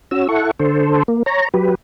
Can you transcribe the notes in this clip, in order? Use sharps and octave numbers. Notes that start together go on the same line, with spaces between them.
C#4 F#4 E6
E4 A4 F#5 C#6
D3 A4 C5
A#3
C#5 A#5
F#3 G4 B4